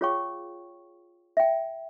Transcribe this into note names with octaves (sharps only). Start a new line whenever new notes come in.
F4 G#4 C#5 F5 G5 C#6
E5 G5